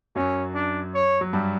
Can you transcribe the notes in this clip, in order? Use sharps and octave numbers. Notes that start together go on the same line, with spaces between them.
F#2 F#3 C#4
D4
C#5
F#3
G2 G3